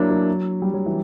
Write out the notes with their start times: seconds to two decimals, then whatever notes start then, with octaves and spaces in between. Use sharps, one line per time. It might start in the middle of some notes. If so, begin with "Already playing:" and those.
Already playing: F#3 A#3 D4 E4
0.10 F#3
0.62 G3
0.74 F#3
0.86 E3